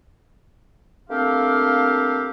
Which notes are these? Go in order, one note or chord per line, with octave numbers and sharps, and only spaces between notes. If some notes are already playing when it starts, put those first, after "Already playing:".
A3 A#3 C4 D4 G4 F5